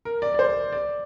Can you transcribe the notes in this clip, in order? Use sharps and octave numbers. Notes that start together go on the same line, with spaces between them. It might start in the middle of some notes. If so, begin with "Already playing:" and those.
A#4
D5
D5
C5
D5